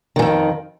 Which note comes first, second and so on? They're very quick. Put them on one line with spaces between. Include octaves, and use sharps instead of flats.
D#3 G#2 F2